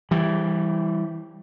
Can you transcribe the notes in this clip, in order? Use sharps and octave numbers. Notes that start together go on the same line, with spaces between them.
E3 G3